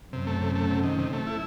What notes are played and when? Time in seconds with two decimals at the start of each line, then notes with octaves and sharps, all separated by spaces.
0.13 F#2 C3
0.27 A3
0.41 C3
0.55 A3
0.70 C3
0.83 D#3
0.99 C3
1.13 A3
1.27 E4